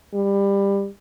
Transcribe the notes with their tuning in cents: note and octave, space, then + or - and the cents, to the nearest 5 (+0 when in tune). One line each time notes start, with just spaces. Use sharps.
G3 +20